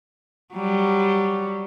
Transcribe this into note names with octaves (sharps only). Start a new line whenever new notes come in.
F#3 G3